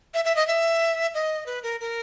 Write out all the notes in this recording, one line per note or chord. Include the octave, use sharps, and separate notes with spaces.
E5
E5
D#5
E5
D#5
B4
A#4
A#4